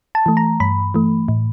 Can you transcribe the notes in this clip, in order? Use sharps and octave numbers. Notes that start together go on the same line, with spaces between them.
A5
E3 A3
A#5
G2 B5
E3 A3
A2